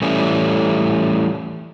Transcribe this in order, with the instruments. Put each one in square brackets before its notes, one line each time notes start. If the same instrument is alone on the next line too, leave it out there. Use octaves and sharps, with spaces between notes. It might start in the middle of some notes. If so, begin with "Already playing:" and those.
[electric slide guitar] E3 G3 A3 C#4